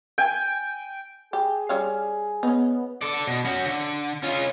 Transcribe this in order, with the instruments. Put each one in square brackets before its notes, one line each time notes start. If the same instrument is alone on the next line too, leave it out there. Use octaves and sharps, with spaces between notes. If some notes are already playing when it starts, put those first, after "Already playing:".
[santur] G5 G#5
[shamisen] G4 [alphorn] G#4
[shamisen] G3 C#4 F5
[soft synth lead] B3 [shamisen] C#4 D#4
[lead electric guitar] A4 D5
B2
C#4 F#4
D3
C#4 F4